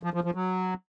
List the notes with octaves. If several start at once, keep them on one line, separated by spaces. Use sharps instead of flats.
F3
F3
F3
F#3